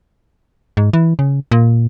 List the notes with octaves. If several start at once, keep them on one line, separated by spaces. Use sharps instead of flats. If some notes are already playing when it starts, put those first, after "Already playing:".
G#2
E3
C#3
A#2